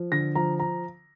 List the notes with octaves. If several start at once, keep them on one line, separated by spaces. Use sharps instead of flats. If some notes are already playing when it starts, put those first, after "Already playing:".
Already playing: F3
D3 A#6
F3 A#5
A#5